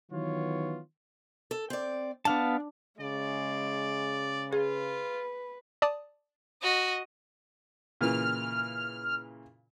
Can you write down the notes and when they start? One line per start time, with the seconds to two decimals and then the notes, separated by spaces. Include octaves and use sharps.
0.12 D#3 E3 F#3 B3 F4 C#5
1.51 A4
1.70 C4 D5
2.25 B3 D4 F5 A5
3.01 C#3 G#3 D5
4.53 F4 G#4 B4
5.82 D5 A5 D#6
6.62 F#4 D#5
8.01 A#2 C#3 E3 F6